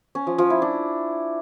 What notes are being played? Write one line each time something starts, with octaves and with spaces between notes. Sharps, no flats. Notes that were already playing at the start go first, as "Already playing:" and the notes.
C#4
F3
F3
E4
D4